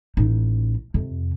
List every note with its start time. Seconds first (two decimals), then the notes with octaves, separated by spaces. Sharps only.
0.17 A1 D#4
0.94 F2 C3